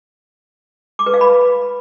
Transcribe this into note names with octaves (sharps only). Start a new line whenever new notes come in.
D6
B4
F5
B5